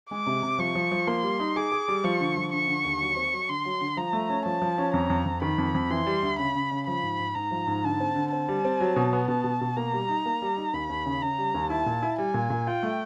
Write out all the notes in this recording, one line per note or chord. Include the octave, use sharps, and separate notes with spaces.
G#3 D6
C3
C3
F3 C#6
F3
F3
A#3 C6
G3
D#4
G#4 D6
G#4
G3
F3 C#6
D3
F3
D3 C#6
D3
D#2
F#3
C4
F#3
D3 C6
F#3
D3
F3 A#5
A3
C#4
F3 A5
F3
C#4
F2 A#5
F2
F2
D#3 B5
F2
F2
E3 C6
G3
D2
C#3 B5
C#3
C#3
F3 B5
G#2
G#2
G#2 A#5
F3
G#2
D3 A5
C4
D3
C4 A5
G3
C4
F#3
B2
B3
B2 A5
B2
B2
A#3 A#5
G3
D#4
A#3
G3
D#4
D#2 B5
D#2
C#3
C#3 A#5
G3
D#2
E4 A5
A#2
E4
G3 G#5
A#2
A#2
F4 G5
A3